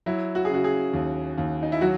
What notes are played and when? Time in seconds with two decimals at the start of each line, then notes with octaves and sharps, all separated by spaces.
0.06 F#3 E4
0.35 F#4
0.45 G#4
0.50 C#3 F#4
0.64 G#4
0.93 D#2
1.38 D#2
1.63 D#4
1.72 E4
1.81 F#3 F#4